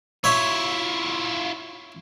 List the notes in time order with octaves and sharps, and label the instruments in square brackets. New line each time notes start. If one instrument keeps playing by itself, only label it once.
[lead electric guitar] E4 F4 [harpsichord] C#5 E5 C#6